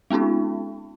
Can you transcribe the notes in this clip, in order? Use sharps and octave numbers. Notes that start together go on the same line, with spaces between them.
G#3 B3 C#4 D#4 F4